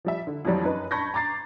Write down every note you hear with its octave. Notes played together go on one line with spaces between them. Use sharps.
F3 G3 E5
D3
F2 E3 F#3 G3
F#2 C#4 D#4 B4
A5 B5 C#6 G6 G#6 A#6
A#5 D6 A6 C7